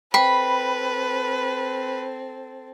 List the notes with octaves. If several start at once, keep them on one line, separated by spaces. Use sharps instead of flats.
C4 A4 B4 G5 B5